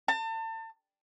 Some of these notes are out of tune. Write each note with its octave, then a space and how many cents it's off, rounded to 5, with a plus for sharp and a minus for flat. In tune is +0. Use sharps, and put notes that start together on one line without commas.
A5 +35